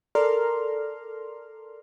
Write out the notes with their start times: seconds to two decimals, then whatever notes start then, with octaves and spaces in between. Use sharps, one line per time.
0.15 A4 A#4 D5 A#5 C6 F6